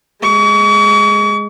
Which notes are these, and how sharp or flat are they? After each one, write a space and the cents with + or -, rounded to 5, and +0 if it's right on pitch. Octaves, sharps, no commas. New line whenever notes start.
G#3 +0 C#6 +40